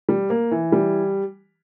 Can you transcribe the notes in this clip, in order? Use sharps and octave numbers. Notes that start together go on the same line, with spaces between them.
G3
A#3
E3
G3